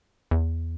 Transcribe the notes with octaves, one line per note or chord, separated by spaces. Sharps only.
E2